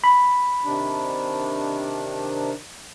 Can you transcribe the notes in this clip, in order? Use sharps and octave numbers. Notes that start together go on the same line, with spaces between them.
B5
C3 D#3 D4